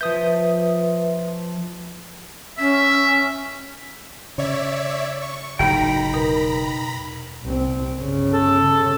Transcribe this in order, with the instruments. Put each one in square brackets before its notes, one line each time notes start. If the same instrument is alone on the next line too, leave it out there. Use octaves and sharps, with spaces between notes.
[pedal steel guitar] F3 D#6 G6 [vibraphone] B4 E5
[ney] C#4 [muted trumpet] E5
[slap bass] C#3 [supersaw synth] C#5 D5 E5
[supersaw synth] C#6
[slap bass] F#1 A2 [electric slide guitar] D#4 G5 [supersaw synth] A#5 B5
[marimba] E2 B2 A#4
[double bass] C2 C4
G1 C#3
[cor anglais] A4